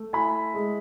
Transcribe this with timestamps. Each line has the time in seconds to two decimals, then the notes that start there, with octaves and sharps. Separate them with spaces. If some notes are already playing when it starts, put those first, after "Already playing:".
Already playing: A3
0.13 E4 G#5 B5
0.54 G#3